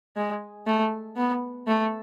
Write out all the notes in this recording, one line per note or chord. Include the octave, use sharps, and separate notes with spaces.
G#3
A3
B3
A3